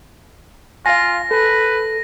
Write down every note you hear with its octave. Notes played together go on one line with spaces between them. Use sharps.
F4 F5 G#5 A#6
A4 B4